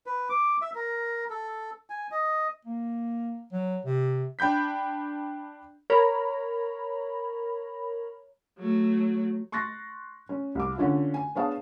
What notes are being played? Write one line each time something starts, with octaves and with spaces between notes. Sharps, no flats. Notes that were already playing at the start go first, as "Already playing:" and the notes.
B4
D6
E5
A#4
A4
G#5
D#5
A#3
F#3
C3
D4 G5 B5 G6 B6
A#4 C#5 A#5 B5
F#3 A3
C6 C#6 F#6 A6 A#6
C#4
C2 D6
D3 C#4 D4 F4
G#5
B3 D4 G#4 C#5 F5 A5